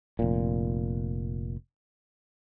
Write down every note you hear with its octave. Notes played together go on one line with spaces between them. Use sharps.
F1 A#2